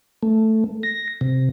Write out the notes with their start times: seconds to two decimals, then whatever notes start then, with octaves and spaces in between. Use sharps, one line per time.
0.23 A3
0.83 A#6
1.21 C3